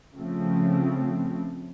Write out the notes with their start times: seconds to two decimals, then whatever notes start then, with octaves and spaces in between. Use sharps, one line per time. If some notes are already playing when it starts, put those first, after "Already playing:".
0.14 C#3 F3 A3 C4